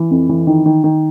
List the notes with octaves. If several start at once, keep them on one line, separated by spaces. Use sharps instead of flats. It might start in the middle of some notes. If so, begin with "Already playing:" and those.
Already playing: E3
F2
E3
D#3
D#3
D#3